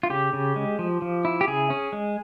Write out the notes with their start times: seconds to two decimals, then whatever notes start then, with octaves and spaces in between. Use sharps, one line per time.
0.03 F4
0.10 C#3 G4
0.33 C#3
0.56 G#3
0.79 F3
1.02 F3
1.25 E4
1.41 G4
1.47 C#3 G#4
1.70 C#4
1.93 G#3